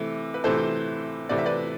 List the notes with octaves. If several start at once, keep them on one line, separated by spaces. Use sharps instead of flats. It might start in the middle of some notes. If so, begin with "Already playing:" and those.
Already playing: C3 E3 A3
B4
C3 E3 A3 A4 C5
C3 E3 A3 D5
E5
B4 D5